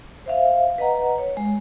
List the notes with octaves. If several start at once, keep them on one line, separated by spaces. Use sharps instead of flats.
C5 E5 F5
B4 D#5 F#5 A#5
C#5
G#3